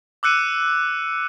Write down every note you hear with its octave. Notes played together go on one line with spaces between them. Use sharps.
D6 E6 F#6 C#7 D#7